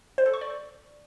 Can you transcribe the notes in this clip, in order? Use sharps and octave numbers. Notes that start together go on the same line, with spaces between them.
C5
A4
C#6
D5